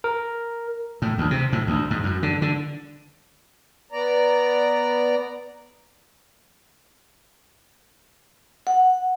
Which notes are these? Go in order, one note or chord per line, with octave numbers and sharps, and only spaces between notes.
A#4
A2
D2
C3
A2
D2
G#2
F#2
D3
D3
B3 D5 A#5
F#5